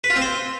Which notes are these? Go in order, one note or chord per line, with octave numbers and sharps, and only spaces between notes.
B4
F4
C4
C5